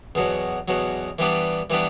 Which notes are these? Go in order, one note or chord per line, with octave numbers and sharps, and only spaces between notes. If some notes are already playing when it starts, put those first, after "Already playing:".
E2 B2 F#3
E2 B2 F#3
E3 G3 B3 D4
E3 G3 B3 D4